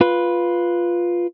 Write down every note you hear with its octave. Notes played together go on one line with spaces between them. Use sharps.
F4 B4